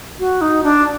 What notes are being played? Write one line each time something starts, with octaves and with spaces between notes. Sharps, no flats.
F#4
D#4
D4